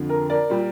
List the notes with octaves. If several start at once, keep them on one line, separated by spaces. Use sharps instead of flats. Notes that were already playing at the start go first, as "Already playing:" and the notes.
Already playing: F2 D3 F3
A#4
A#4 D5
A#2 G3